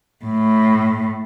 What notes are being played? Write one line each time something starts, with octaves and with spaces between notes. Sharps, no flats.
A2